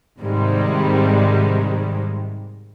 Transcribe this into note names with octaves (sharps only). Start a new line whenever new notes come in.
G#2 C3 D#3 G3 G#3